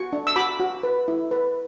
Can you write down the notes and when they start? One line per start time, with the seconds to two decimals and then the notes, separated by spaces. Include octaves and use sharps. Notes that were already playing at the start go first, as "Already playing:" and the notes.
Already playing: F#4 C#6
0.13 D4
0.27 E6
0.36 F#4 B5 D6
0.59 F#4
0.83 B4
1.08 E4
1.31 B4